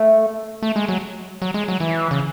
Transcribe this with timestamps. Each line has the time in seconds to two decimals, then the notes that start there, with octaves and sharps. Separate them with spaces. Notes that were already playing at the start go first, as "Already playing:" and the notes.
Already playing: A3
0.62 A3
0.76 G#3
0.88 F#3
1.42 F#3
1.54 G#3
1.68 F#3
1.80 E3
2.11 C#3